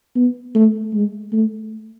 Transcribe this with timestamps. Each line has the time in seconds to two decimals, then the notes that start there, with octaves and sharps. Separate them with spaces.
0.16 B3
0.55 A3
0.93 G#3
1.33 A3